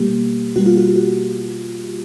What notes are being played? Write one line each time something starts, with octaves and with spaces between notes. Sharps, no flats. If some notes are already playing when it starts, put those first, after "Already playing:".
Already playing: B2 G3 A#3 G4
B2 G3 A#3 F#4
F4
F#4
F#4